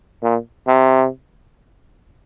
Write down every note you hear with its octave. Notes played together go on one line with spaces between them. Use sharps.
A#2
C3